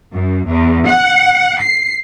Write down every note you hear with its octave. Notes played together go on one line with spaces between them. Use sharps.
F#2
E2
F#5
C7